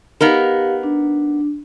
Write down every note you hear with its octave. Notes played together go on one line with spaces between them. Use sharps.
B3 D#4 G4 A#4 F5
D4